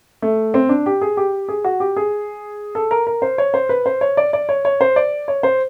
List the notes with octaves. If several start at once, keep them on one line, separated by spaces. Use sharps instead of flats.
A3
C4
D4
G4
G#4
G4
G#4
F#4
G4
G#4
A4
A#4
A#4
C5
C#5
C5
B4
C5
C#5
D5
D5
C#5
C#5
C5
D5
C#5
C5